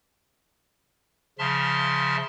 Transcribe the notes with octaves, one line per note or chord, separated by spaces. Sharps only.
C#3 F3 E5 A5 C6 F6